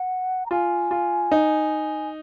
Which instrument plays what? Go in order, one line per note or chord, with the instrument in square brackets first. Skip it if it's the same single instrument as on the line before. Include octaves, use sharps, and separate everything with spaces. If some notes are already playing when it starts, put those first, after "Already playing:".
Already playing: [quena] F#5
A#5
[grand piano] F4 [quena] G#5
[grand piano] F4
D#4